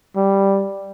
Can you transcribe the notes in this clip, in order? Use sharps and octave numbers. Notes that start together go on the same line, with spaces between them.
G3